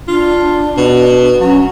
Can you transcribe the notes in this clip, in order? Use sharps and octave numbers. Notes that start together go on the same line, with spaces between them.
D4 F4
B2
F#3 C#4